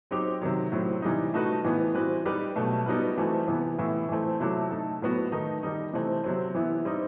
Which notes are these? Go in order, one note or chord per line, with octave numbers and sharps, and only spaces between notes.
F#3 C4 D#4 G4
C3 D#3 F#3
A2 F#3 C4
C3 E3 G3 D#4
A3 D#4 F#4 B4
A2 E3 B3
E3 G3 C4 F#4 B4
G3 D#4 G4 B4
B2 F#3 A3
G3 B3 D#4 F#4 B4
E3 A3 C4 F#4 A4
C3 E3 B3
A2 E3 B3 E4
E3 A3 C4
C3 F#3 A3 E4 G4
A3 D#4 A4
A2 F#3 B3 F#4
D#3 A3 D#4
D#3 G3 D#4
C3 E3 A3 C4
C3 F#3 C4
E3 B3 E4
G3 C4 D#4